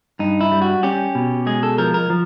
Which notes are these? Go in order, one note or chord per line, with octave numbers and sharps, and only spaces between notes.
G2 D#4
E4
G3
F#4
C#4 G4
B2
G#3 G#4
A4
F3 A#4
A#4
F3